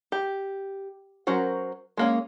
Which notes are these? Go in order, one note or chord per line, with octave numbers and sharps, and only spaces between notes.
G4
F#3 C#4 F#4 A#4 C5
G#3 A#3 C#4